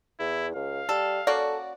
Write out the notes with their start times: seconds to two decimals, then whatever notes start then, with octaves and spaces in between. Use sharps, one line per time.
0.20 E2 E4
0.55 C#2 F5
0.89 G3 A4
1.27 A#3 C#4 F#4 A4 D5